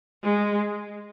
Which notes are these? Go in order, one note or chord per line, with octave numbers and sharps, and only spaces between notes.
G#3